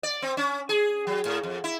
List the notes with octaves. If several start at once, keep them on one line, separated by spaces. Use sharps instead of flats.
D5
C4
C#4
G#4
F#3
A2
F2
E4